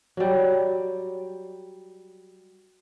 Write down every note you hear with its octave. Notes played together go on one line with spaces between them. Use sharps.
F#3 G3